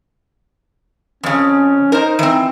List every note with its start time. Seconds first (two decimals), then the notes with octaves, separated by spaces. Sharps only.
1.23 F2 C#3 C#4
1.92 D#4 A#4 C5
2.19 E3 C4